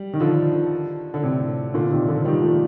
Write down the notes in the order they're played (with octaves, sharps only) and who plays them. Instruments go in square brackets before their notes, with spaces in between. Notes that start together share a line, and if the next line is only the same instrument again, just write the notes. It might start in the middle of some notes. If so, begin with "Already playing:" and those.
Already playing: [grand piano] G3
D#3
D3 F3
D3
A2 C3
A#2 D3
C3 D#3
D3 F3
D#3 G3
F3 A3